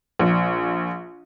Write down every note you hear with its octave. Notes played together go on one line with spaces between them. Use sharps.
A#1